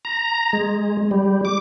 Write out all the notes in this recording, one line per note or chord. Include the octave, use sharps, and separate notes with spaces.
A#5
G#3
G3
D6